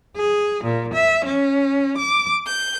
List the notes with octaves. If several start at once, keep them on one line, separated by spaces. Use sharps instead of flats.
G#4
A#2
E5
C#4
D6
G6